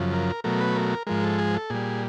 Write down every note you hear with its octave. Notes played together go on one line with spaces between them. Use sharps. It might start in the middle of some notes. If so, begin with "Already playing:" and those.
Already playing: F#2 C#3 F3
A#4
B2 F#3 A3 A#4
B4
A#4
G#2 F3 G#3 A#4
A4
G#4
A4
A#2 G3 G#4